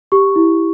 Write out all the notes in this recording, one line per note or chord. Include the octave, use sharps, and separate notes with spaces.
G4 C#6
E4